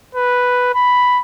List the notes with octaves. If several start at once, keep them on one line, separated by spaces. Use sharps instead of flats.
B4
B5